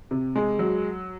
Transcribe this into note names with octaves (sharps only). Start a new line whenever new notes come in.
C3
G#3
F#3